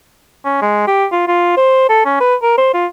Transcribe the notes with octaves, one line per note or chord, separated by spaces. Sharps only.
C#4
G#3
G4
F4
F4
C5
A4
C#4
B4
A#4
C5
F4